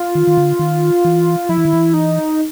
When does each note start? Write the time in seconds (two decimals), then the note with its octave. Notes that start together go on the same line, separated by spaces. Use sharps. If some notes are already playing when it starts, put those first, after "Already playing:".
Already playing: F4
0.15 D#3
0.27 D#3
0.37 D3
0.59 D#3
1.05 E3
1.49 F3 E4
1.58 E3
1.65 D#3
1.73 E3
1.94 D#4